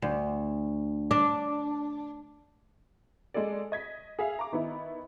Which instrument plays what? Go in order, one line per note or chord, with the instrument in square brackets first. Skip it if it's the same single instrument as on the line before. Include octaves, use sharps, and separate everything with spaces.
[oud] D2
D4
[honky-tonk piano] G#3 G#4 A4 D5
D#5 G#6 B6
G#4 E5 F5
A#5 D6
D#3 B3 D#4 E4